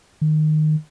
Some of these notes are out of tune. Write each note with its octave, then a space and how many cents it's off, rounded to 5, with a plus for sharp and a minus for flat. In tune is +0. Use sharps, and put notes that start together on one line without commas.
D#3 -15